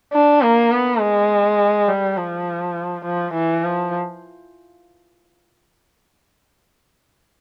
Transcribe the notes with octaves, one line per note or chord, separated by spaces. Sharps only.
D4
A#3
B3
G#3
G3
F3
F3
E3
F3